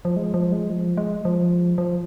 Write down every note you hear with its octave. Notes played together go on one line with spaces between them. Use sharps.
F3
G#3
F3
G#3
F3
G#3
F3
F3